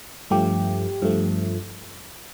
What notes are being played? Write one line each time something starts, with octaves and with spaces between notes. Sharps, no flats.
G2 F3 A3 G4
G2 F3 A3